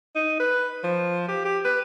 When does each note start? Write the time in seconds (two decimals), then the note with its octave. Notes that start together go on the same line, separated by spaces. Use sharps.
0.15 D#4
0.40 B4
0.84 F3
1.28 G4
1.45 G4
1.65 B4